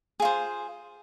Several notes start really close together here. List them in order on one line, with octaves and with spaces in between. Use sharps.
G#4 F4 C5